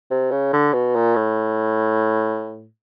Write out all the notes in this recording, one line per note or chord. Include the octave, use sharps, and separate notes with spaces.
C3
C#3
D3
B2
A#2
A2